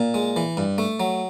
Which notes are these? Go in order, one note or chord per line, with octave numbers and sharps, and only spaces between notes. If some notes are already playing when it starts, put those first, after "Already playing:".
Already playing: A#2
G#3
E3
G2
A3
F#3